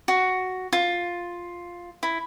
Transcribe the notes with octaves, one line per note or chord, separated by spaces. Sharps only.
F#4
F4
E4